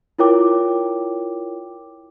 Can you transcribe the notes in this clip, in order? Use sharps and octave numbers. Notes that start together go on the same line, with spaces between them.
E4 F4 A#4 C#5 G5 D6